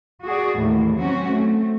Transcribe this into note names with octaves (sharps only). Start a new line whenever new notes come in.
F#4 G#4 D5
D#2 A2 E3
F#3 C4 C#4 F#4
A3 C4